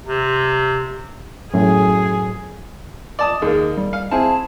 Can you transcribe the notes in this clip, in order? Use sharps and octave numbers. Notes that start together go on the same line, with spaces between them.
C3
F#2 A2 G#4
D5 A5 D#6
D#2 A#3 G#4
G3
F5
C4 E4 G#4 A5